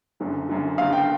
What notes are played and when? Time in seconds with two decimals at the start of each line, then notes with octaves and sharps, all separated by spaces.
0.20 F#1 F#2 D3
0.49 F#1 F#2 D3
0.78 F#1 F#2 D3 F5
0.93 G5